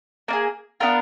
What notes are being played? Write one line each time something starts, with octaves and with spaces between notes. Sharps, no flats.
A#3 D4 G#4
B3 D4 F4 A#4